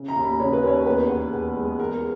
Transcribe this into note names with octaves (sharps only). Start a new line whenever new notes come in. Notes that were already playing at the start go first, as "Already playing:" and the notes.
Already playing: C#3
A#5
D#2
B5
C#3 C#5
B4
D#2 C#5
E2 B4
E2
E2
G#3
E2 A#4